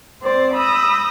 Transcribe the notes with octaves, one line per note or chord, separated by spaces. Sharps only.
C4 C5 D5
B5 D#6 E6 G6 A#6